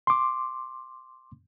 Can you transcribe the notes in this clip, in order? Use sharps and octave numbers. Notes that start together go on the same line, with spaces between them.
C6 D6